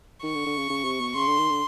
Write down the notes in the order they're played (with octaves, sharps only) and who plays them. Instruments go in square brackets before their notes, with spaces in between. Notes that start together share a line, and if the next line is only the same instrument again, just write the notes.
[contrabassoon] D#3 [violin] C#6
[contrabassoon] D3
D3
C#3
C#3
C3
B2
[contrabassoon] C#3 [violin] C6
[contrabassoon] D3
D#3
D3